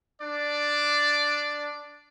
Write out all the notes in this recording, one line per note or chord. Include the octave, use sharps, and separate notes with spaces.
D4 D5